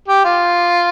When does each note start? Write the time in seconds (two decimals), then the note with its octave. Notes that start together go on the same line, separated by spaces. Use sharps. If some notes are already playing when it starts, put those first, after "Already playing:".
0.08 G4
0.24 F4